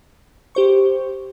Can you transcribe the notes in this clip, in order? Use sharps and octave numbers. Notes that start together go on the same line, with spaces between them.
G4 C5 C#6